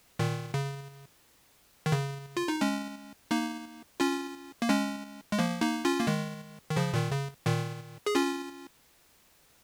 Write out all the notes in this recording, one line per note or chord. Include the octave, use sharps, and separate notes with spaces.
A#2 D#3
C#3
D#3
C#3
F4
D#4
G#3 C#4
A#3 D#4
C#4 F4
A#3
G#3 C#4
G#3
F3 A#3
A#3 D#4
C#4 F4
A#3
D#3 G#3
D#3
C#3 F3
A#2 D#3
C#3
A#2 D#3
G#4
C#4 F4